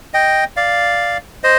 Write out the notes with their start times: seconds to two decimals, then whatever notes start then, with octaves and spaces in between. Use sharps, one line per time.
0.14 D#5 G5
0.57 D5 F5
1.44 C5 D#5